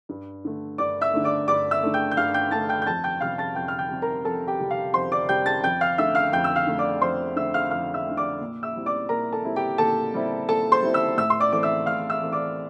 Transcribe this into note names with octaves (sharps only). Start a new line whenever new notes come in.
G2
D3 A3
G2 D5 D6
E5 E6
D3 A3
D5 D6
G2 D5 D6
E5 E6
D3 A3
G5 G6
G6
G2 F5 F6
G5 G6
D3 A3 A5 A6
G5 G6
G6
F2 A5 A6
G5 G6
C3 G3 F5 F6
A5 A6
F2 G5 G6
F6
G5 G6
C3 G3
A#4 A#5
F2 A4 A5
G4 G5
C3 G3
F5
F2 C5 C6
D5 D6
C3 G3 G5 G6
A5 A6
F2 G5 G6
F5 F6
D3 A3 E5 E6
F5 F6
F2 G5 G6
E6
F5 F6
D3 A3
D5 D6
F2 C5 C6
D3 A3 E5 E6
F5 F6
F2 F5 F6
E5 E6
A3
D3
D5 D6
A#2
E5 E6
G3 C4 E4
D5 D6
A#2 A#4 A#5
A4 A5
G3 C4 E4
G4 G5
A#2 A4 A5
G3 C4 E4
A#2 A4 A5
C5 C6
G3 C4 E4
E5 E6
A2 E5 E6
C6
D5 D6
E3 A3 C4 D6
E5 E6
A2 F5 F6
E5 E6
E3 A3 C4
D5 D6